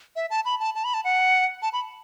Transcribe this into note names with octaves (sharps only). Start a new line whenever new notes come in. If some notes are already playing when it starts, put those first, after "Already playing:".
E5
A5
B5
A5
A5
B5
A5
F#5
A5
B5